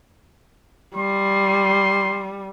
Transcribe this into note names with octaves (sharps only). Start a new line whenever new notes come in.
G3 C6